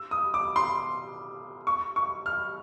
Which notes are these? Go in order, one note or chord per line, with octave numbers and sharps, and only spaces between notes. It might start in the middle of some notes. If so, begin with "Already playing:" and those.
Already playing: E6
D#6
D6
C6
C#6
C#6
F6